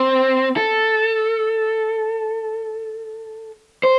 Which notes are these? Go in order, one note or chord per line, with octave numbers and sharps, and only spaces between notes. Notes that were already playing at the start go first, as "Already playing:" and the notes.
Already playing: C4
A4
C5